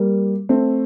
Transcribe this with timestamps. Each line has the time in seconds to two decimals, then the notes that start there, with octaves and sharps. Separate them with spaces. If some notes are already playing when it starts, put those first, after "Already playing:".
Already playing: G3 A#3
0.49 A3 C4